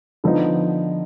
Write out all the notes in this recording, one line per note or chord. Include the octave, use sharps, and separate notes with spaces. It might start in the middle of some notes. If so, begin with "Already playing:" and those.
D3 F3 B3 D#4